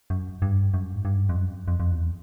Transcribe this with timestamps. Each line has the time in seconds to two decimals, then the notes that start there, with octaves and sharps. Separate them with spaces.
0.10 F#2
0.42 G2
0.74 F#2
0.96 G#2
1.05 G2
1.29 F2
1.36 F#2
1.68 F2
1.80 F2
1.91 E2